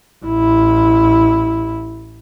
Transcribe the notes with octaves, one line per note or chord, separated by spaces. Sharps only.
A1 E4